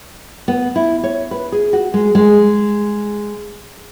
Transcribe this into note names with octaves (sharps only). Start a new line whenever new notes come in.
B3
E4
C#5
B4
G#4
F#4
G#3
G#3